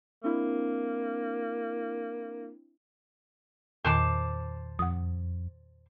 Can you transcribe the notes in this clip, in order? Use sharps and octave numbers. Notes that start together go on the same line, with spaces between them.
A#3 C4 D4 E4
E2 A#2 D#3 C5 A5 D6
F2 F#5 D#6